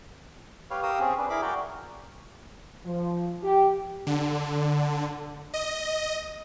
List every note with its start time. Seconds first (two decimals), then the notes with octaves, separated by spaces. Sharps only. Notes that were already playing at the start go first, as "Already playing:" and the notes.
0.70 G4 B4 C#5 F5
0.83 G4 A#4 F5 D#6 E6
1.00 C4 C#4 G#4
1.18 D4 B4
1.30 E4 G#4 A#4 B5 D6
1.42 F#4 A#4 D5 G5
2.85 F3
3.43 G4
4.07 D3
5.54 D#5